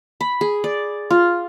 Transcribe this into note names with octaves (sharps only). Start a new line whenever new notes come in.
B5
G#4
D5
F4